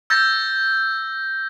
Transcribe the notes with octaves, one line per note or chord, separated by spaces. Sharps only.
E6 G6 A6 A#6